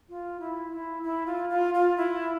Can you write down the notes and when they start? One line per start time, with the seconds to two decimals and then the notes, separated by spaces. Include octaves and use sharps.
0.09 F4
0.40 E4
0.71 E4
1.03 E4
1.26 F4
1.50 F4
1.74 F4
1.97 E4